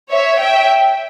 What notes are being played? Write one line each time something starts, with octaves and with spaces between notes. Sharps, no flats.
C#5 E5
E5 G5